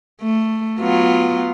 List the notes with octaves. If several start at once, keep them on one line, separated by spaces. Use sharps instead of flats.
A3
F#3 B3 F4